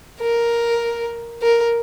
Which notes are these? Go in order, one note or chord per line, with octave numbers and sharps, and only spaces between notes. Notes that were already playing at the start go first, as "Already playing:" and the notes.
A#4
A#4